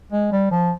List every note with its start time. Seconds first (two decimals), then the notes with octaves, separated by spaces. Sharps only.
0.12 G#3
0.32 G3
0.51 F3